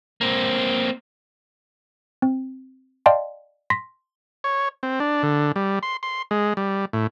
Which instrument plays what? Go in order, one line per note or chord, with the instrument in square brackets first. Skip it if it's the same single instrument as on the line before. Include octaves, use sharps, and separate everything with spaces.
[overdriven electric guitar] A#3 C4
[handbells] C4
D5 D#5 F5 G5 A5 C6
C6 A#6 B6
[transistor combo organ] C#5
C4
D4
D3
G3
C6
C6
G#3
G3
A2